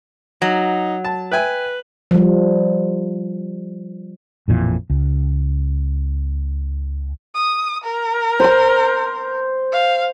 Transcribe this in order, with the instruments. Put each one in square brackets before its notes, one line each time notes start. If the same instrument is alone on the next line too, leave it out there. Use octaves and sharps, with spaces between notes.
[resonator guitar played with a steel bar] F#3 [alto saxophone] D#4
[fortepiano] A5
[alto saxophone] B4 [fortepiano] E5 G5 G#5
[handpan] F3 G3
[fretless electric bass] A1 F2 A#2 E3
C#2
[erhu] D#6
A#4
[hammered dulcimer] C5 C6
[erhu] F5